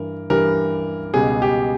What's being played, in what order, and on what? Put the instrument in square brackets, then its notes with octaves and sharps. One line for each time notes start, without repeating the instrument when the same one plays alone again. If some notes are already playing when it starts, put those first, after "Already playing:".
Already playing: [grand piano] G2 E3 A#4
G2 E3 G3 A#4
C#2 B2 G3 G#4
G4